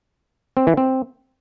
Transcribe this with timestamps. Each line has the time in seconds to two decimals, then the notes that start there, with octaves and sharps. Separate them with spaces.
0.57 C4
0.67 E3
0.77 C4